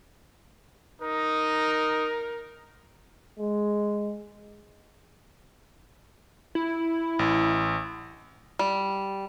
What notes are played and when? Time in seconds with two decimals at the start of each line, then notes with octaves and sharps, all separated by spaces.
1.02 D#4 A#4
3.39 G#3
6.55 E4
7.19 A1
8.59 G3